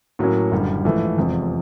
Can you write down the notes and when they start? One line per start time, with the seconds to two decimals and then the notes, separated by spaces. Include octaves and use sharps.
0.19 A2 F#3 A#3 C#4
0.51 F#1 F#2 D3 G3
0.84 A#1 G#2 E3 A3
1.17 F1 E2 C3 F3 G#3